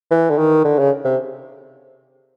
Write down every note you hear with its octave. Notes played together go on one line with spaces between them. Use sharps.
E3
D3
D#3
D3
C#3
C3